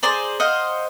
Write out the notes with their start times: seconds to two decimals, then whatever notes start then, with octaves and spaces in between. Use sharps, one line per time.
0.03 G#4 C5 D5 A#5
0.40 C5 D#5 F5 F#5